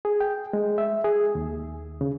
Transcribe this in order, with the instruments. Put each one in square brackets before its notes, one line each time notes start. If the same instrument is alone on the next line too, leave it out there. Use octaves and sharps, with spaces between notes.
[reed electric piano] G#4
G5
G#3
E5
G#4
D#2
C#3